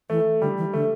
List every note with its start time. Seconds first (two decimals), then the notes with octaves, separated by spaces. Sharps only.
0.10 E3 A3
0.41 D3 G3
0.58 E3
0.73 D3 A3